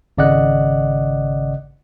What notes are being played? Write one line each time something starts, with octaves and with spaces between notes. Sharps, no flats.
G#1 C#3 D5 D#5 F#5 F#6